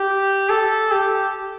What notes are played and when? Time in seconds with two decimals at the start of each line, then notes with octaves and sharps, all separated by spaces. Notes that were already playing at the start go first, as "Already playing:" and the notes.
Already playing: G4
0.49 A4
0.91 G4